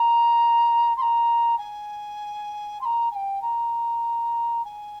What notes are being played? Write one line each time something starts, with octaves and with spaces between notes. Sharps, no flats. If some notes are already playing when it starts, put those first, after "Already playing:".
Already playing: A#5
C6
A#5
G#5
C6
A#5
G#5
G5
A#5
G#5